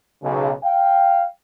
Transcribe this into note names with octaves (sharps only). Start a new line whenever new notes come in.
B1 C#3
F5 G5